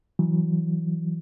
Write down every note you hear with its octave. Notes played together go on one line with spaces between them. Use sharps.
E3 F#3